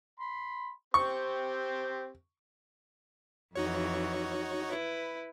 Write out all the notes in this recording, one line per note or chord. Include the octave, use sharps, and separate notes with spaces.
B5 C6
C4 G4 C5 C#6
F2 E3 D#4 F#4 C#5
E4 B4